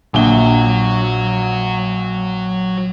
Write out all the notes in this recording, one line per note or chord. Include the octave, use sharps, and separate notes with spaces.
A#1 F#3 F#4 G7